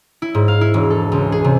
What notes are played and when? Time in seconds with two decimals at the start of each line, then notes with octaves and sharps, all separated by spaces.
0.22 E4
0.35 G#2
0.48 F5
0.61 E4
0.74 E1
0.90 A4
1.12 C#2
1.32 G#4
1.44 C3